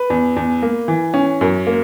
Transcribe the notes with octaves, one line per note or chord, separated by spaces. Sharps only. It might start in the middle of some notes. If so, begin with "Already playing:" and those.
Already playing: B4
E2
E2
A#3
E3
C#4
F#2
A#3